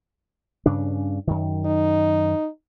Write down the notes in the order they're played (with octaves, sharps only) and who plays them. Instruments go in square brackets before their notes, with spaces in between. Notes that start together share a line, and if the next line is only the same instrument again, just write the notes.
[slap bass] G2 C#3 D4
F#2 D#3
[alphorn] D#4